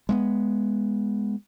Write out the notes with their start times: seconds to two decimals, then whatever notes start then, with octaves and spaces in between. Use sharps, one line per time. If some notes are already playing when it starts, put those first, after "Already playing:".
0.09 G#3 A3 B3